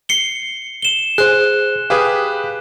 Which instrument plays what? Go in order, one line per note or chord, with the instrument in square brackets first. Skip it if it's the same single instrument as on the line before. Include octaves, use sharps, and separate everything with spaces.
[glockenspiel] C7 C#7 G7
E7 G7
[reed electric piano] G#4 C5 [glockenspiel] F#6
[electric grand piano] G4 G#4 B4 [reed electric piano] F5 D#6